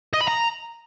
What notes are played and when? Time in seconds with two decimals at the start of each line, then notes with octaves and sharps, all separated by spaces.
0.14 D#5
0.21 B5
0.28 A#5